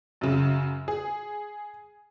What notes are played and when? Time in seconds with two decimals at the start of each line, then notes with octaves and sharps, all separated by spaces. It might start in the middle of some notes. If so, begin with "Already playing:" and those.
0.21 F#2 C#3
0.88 G#4